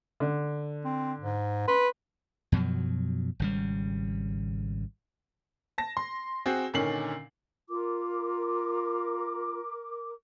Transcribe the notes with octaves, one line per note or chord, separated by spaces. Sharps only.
D3
C4
G#2
B4 C6
F#2 B2 F3 F#3
G#1 C#3 G3
A5 A#6
C6
C4 F#4 G#4
A#2 D3 D#3 C#4 C7 F#7
F4 A#4 D6